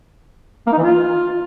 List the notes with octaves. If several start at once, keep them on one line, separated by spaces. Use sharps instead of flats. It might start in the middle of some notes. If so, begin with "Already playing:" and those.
A#3
D#4
E3
F4